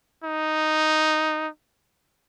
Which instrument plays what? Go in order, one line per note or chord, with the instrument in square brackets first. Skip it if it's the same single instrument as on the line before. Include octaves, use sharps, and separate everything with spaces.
[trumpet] D#4